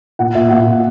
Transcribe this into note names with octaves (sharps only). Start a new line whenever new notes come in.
A#2 F#5
A#2 E5
A#2 F#5
A#2